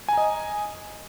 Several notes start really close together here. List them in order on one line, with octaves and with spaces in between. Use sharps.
G#5 A#5 D#5